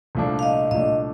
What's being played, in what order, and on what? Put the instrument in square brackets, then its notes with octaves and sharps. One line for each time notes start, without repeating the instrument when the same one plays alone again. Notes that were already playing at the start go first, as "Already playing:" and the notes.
[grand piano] C2 A#2 F3 A3 D4
[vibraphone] F5
D#5
[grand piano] C2 A#2 F3 A3 D4 [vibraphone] D#5